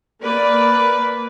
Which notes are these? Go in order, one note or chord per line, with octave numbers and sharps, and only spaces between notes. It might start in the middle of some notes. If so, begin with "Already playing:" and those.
A#3 B4 D5